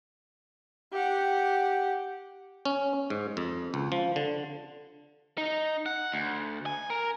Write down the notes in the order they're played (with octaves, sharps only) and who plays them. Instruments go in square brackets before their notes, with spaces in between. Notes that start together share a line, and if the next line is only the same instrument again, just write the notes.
[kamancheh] G4 F#5
[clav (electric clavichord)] C#4
G#2
F2
C#2
F3
D3
[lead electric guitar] D#4
F#5
D2
G#5
A#4